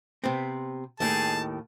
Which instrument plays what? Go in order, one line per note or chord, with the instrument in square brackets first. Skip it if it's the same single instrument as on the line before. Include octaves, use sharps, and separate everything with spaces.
[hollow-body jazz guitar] C3 B3 C4
[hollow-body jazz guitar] D#2 A2 D#3 [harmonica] G#4 A5